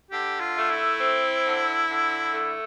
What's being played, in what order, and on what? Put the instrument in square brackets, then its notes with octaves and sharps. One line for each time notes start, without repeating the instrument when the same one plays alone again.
[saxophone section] D3 [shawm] G4
[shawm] F4
[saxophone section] A3
[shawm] E4
[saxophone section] C4
D3
D3
A3